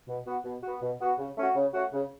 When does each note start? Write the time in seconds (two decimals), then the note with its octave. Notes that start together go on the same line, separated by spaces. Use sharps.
0.08 B2
0.27 B3 F#4
0.45 B2
0.63 B3 F#4
0.82 B2
1.01 B3 F#4
1.18 C#3
1.37 A3 C#4 F#4
1.56 C#3
1.74 A3 C#4 F#4
1.93 C#3